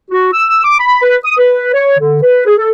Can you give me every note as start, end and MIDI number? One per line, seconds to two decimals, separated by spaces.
0.10 0.28 66
0.33 0.60 88
0.64 0.79 86
0.79 1.02 83
1.03 1.17 71
1.25 1.34 87
1.38 1.69 71
1.73 1.97 73
1.98 2.19 50
2.22 2.43 71
2.46 2.53 68
2.58 2.71 69